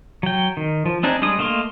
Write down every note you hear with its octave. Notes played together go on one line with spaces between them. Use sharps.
F#3 G5
D#3
F3
C4 D4 D#4 G#4
G3 G#3 D4 D#6
A3 A#3 D#5 F5 C6